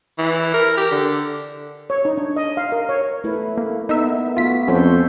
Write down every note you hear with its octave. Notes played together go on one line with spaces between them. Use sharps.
E3
A#4
G4
D3
C#5
D#4
D4
D#5
F5
A#4
C#5
A3 E4 B4
A#3
B3 D#4 A#4 E5
A3 B3 F4 F#4 B6
F2 C#4 A4 C5 C#5